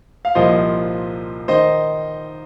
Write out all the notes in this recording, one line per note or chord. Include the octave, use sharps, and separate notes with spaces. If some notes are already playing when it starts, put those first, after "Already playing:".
F5
C2 A#2 F3 C5 D#5
D#3 C5 D#5